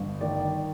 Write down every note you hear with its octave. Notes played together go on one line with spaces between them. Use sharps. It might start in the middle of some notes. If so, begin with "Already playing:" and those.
Already playing: G1
D#3 D5